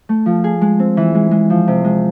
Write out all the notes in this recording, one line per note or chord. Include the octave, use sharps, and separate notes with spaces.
A3
F3
G#4
G#3
C4
E3
G#3
G#3
F3
C3
G#3